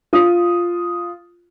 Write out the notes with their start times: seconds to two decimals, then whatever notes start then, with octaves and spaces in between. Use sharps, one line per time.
0.13 F4 D#6